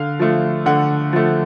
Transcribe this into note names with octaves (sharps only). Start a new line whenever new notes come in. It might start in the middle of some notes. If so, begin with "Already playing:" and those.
Already playing: D3 F5
F3 A3
D3 F#5
F3 A3